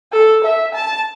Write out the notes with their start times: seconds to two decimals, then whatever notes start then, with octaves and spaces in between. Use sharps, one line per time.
0.13 A4
0.44 E5
0.75 A5